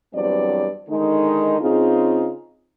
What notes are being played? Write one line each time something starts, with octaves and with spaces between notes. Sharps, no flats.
E2 G2 F#3 C4 D5
D3 D#3 G#3 D#4
C#3 C4 D#4 F4 G#4